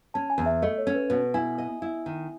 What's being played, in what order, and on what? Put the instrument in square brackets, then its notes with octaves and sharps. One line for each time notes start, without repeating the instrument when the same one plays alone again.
[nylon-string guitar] C#4 [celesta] A5
[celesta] G#5
[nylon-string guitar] E2
[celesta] E5
[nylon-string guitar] A3 [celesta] D#5
[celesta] C#5
[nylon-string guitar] C#4
[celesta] B4
[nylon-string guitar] B2 [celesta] B4
[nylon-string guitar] E4 [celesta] G#5
[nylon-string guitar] D#5
E4
D#3